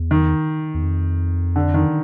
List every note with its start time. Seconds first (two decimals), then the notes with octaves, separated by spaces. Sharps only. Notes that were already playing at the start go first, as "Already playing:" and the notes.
Already playing: E2
0.11 D#3
0.74 E2
0.83 F2
1.56 D3
1.74 D#3